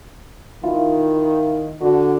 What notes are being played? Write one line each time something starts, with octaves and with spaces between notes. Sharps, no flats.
D#3 E4 F4
D3 F#4